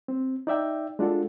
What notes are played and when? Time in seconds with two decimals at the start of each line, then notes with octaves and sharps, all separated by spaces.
0.08 C4
0.47 D#4 D5 E5 G5
0.99 G#3 D4 F4 F#4 A4